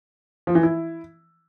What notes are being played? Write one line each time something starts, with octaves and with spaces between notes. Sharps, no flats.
F3
E3
E4